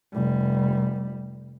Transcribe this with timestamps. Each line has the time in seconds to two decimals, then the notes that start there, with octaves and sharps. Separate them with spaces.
0.13 F1 G3